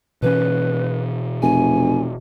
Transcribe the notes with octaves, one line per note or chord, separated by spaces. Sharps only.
B2 E3 C#4 B4
F1 G#5